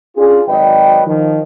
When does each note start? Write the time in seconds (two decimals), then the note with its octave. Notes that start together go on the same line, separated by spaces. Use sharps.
0.17 C#4 D4 F4 G#4
0.47 G#1 F#3 B4 D5 D#5 G5
1.06 D#3 F3